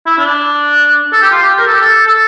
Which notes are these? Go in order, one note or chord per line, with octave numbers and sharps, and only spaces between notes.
E4
D4
A4
G4
F4
G4
A#4
A4
G4
A4
A4